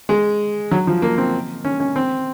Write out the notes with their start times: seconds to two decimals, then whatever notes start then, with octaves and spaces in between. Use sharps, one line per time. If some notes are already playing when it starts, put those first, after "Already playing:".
0.09 G#3
0.71 F#3
0.87 F3
1.02 A#3
1.18 C4
1.65 C#4
1.80 C#4
1.96 C4